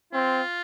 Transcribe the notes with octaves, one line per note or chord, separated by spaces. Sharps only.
C4 F4